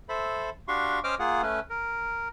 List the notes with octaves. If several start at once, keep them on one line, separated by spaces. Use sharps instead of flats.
A4 C5 E5 B5
D4 F#4 G4 F5 C6 C#6
C#4 C5 D#5 G5 D6 F6
A#3 F4 G#4 F#5
A3 C#4 B4
A#4